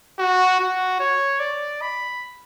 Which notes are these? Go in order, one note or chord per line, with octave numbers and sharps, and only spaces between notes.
F#4
F#4
C#5
D5
B5